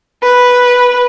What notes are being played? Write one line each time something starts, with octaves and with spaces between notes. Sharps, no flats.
B4